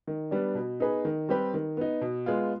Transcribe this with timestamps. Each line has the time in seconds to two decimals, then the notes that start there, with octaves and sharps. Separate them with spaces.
0.07 D#3
0.31 G3 B3 D4
0.55 B2
0.80 B3 D#4 G#4 B4
1.05 D#3
1.29 G3 C4 G4 B4
1.54 D#3
1.77 B3 D#4
2.01 B2
2.26 G#3 B3 F4